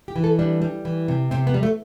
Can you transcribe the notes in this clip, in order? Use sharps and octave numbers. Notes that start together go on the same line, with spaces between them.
G4
E3
A4
G3 D4
G3
E3
C3
C3 C4
B3
G3
A3